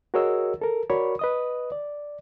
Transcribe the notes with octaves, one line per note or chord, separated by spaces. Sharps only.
F#4 G#4 A#4 C#5 D#5 E6
A4 A#4
F#4 A#4 C#5 D5 B5 C#6
B4 D#5 D#6
D5